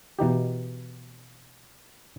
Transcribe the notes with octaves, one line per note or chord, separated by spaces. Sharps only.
B2 E3 D#4 G4